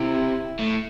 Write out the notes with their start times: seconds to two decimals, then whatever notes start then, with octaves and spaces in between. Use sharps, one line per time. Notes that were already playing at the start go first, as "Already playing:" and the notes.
Already playing: C3 E4
0.59 A2